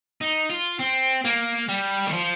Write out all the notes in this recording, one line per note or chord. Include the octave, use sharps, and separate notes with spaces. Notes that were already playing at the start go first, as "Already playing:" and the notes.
D#4
F4
C4
A#3
G3
D#3
F3